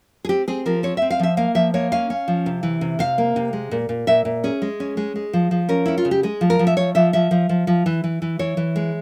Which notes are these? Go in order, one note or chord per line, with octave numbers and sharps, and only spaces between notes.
G#4
C4 G4
C4 G#4
F3 A#4
C4 C#5
E5
C4
F5
F3 E5
A#3 F5
F3 E5
A#3 C#5
C#4 F5
C#4
F3
C3
E3
C3
C3 F5
A#3
C3
G#3
A#2
A#2
A#2 E5
A#2
C#4 G#4
G#3
C#4
G#3
G#3
F3
F3
C#4 A#4
C#4 E4
F4
C#3
G4
G#3 G#4
F3
A#4
F3
E5
F3 C#5
F3 E5
F3 E5
F3
F3
F3
E3
E3
E3
E3 C#5
E3
G#3